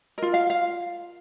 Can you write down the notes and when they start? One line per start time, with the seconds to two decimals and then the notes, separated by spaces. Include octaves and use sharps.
0.18 F4 A#4 D#5
0.34 F5
0.50 F5